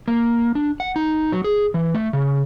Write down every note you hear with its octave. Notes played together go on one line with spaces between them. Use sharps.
A#3
D4
F#5
D#4
F#3
G#4
E3
A3
C#3